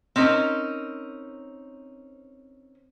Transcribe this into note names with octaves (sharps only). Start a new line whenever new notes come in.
C4 C#4 D#4 A#4